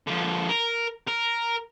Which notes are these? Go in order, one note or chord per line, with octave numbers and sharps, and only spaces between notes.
D3 F3
A#4
A#4